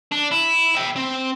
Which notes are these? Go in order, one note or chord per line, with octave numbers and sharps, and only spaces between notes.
D4
E4
E5 G5
C4